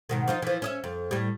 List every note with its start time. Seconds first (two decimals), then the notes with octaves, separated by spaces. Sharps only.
0.09 G#2 B2 D#3
0.28 F3 D#4 F4
0.42 E3 F3
0.62 C#4 D#5 E5
0.84 F2
1.11 A2 G3